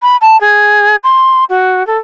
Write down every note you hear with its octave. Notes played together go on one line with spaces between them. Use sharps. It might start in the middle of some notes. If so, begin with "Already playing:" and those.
B5
A5
G#4
C6
F#4
A4